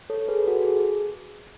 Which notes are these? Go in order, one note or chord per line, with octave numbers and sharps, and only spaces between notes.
A4 C#5
G#4 B4
F#4 A4
G#4